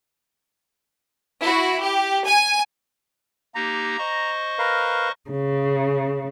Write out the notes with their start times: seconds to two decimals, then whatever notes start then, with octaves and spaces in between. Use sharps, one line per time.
1.42 E4 F#4
1.81 G4
2.25 G#5
3.55 A#3 D#4 G4 A#5
3.98 C5 D#5 C#6
4.59 A#4 B4 F5
5.31 C#3